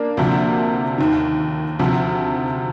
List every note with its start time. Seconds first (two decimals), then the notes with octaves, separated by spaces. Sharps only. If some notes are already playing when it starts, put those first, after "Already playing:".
Already playing: A#3 D4
0.17 D2 C3 F3
0.98 D#2 D#3
1.79 D2 C3 F3